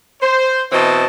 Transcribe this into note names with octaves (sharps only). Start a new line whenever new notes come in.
C5
B2 E3 C4 D#5 A5